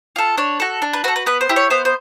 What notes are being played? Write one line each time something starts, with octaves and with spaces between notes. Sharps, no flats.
F4 A4
D4 C#5
F#4 A4
D4
B4
F#4 A4 B4
B4
B3 B4
C5
E4 G4
C#5
B3 C5
C5